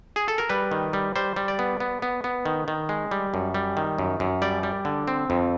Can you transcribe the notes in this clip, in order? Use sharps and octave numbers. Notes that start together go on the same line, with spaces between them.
G#4
A4
A#4
G3 B4
D#3
G3
G3 C5
G3
D5
B3
B3
B3
B3
D#3
D#3
G#3
G3
F#2
G3
D#3
F#2
F#2
G3 D5
G3
D3
C4
F2